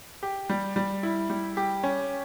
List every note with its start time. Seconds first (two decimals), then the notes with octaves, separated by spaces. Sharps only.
0.23 G4
0.50 G3
0.76 G3
1.03 E4
1.30 G3
1.57 G4
1.84 C#4